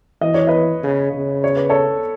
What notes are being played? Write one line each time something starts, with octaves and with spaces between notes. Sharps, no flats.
E3 D#5
C#5
B4 D#5
C#3
C#3
C#5
B4
A4 C#5